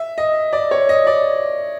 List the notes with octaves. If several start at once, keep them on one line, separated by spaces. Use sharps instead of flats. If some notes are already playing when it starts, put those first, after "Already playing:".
Already playing: E5
D#5
D5
C#5
D#5
D5